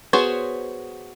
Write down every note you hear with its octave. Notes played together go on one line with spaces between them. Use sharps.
B3 F#4 G#4 C5 C#5